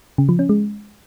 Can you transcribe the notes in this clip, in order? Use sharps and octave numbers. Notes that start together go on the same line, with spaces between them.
C#3
F3
C#4
G#3